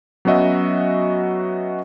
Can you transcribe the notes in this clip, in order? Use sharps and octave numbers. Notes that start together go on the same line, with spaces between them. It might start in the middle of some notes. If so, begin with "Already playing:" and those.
F#3 B3 C#4 F#4 D#5 E5